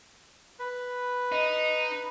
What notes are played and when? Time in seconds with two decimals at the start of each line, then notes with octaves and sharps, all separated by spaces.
0.59 B4
1.32 D#4